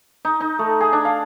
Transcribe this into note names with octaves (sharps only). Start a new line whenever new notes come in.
D#4
D#4
A3
G#4
D4
F5